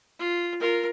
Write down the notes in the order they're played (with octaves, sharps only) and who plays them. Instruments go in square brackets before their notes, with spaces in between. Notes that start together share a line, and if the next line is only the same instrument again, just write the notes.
[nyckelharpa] F4
F4 A#4